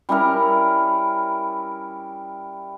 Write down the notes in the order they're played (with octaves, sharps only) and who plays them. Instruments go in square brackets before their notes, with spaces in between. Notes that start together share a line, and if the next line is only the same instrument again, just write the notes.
[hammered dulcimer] G3 C#4 E4 A#4